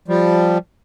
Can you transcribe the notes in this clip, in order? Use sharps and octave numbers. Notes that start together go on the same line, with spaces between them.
F3 G3